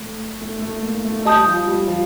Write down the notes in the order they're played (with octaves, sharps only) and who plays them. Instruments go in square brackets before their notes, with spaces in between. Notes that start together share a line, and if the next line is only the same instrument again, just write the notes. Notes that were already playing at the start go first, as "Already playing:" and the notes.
Already playing: [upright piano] A3
A3
A3
A#3
A3
[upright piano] G3 [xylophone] D#5 A5 D#6 G6
[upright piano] F3
G3
F3